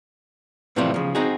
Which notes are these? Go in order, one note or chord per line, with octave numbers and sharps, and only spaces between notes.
A2 C3 E3 F3 G3 C4
C#3 F3
C4 D#4 F#4 G#4